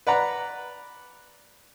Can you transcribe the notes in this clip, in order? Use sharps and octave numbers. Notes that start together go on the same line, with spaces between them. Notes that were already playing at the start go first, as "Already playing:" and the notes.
B4 D5 F#5 A#5